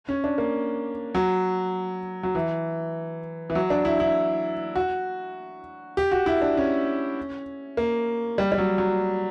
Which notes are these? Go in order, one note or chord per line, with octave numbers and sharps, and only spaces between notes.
C#4
D4
A#3
F#3
F#3
E3
E3
F#3
D4
E4
E4
F#4
G4
F#4
E4
D4
C#4
A#3
G3
G3
F#3
F#3